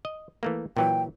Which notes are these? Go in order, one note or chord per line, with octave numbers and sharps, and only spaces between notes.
D#5
E3 A3 A#3
A#2 E3 F#3 G5